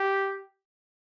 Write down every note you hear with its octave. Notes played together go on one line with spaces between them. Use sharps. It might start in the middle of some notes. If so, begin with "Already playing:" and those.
Already playing: G4